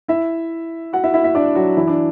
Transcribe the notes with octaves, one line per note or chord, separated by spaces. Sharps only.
E4 E5
F#4 F#5
E4 E5
E4 E5
E4 E5
D4 D5
F#3 F#4
E3 E4
D4